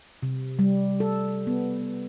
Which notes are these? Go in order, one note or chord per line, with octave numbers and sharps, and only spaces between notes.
C3
G3
A4
B3